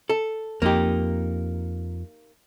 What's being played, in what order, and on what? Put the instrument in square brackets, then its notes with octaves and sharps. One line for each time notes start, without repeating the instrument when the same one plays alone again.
[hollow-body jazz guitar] A4
[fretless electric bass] F2 [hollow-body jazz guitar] A#3 D#4 G4